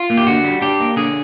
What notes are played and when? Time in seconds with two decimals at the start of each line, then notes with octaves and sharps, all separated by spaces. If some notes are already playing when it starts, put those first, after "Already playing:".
Already playing: F4
0.10 A#3
0.17 G4
0.27 D3 F#4
0.44 G3
0.62 D4 G4
0.80 A#3
0.96 D3 G#4